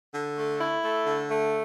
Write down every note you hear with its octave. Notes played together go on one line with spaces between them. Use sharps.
D3
A3
E4
A3
D3
A3